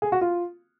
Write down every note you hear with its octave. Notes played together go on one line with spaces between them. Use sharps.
G#4
F#4
F4